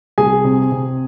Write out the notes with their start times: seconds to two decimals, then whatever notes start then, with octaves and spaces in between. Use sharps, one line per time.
0.18 C2 G#4 G#5
0.44 C3
0.71 C3